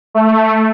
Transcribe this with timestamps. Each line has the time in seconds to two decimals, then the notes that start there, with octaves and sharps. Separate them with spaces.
0.15 A3